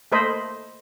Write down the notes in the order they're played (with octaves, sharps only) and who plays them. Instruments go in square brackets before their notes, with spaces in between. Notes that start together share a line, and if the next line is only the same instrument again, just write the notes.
[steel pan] A3 A#3 A4 C5 D#5 B5